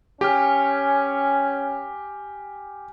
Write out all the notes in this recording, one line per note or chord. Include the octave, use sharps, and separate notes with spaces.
C#4 G4 G#5 F6